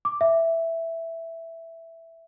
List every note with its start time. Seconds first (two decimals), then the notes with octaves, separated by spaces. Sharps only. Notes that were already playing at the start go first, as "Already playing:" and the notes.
0.05 D6
0.21 E5